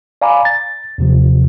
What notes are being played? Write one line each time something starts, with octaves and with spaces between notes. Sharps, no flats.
D5 F5 G#5 A#5 B5 D6
A6
D#2 C3 F3